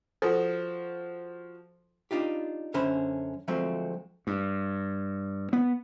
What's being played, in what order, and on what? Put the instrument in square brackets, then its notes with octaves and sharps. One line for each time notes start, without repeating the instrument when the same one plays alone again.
[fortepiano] F3 F#4 [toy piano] A4
[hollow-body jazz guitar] D4 D#4 F4 G4
F#2 D3 C#4 C5 B5
D2 F3 F#3 G#3 A3 C4
[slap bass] G2
B3